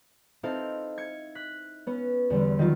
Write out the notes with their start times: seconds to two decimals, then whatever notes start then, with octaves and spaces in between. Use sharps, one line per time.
0.43 C4 D#4 E4 A4 F5
0.98 G#6 C#7
1.35 F#6 B6
1.87 B3 C#4
2.30 E2 D3 G3 C#4
2.59 D#3 F#3 F4